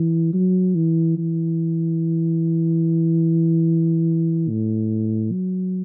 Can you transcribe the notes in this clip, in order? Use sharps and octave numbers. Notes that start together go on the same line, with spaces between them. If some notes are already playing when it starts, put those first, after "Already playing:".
Already playing: E3
F#3
E3
E3
A2
F#3